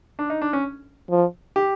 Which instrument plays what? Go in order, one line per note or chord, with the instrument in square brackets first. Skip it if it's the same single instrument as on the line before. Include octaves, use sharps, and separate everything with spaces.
[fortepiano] D4
D#4
D4
C#4
[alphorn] F3
[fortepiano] G4